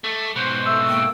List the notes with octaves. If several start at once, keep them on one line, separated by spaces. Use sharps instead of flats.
A3 D6
G#2 B2 C5
A3 E6
A#3 G5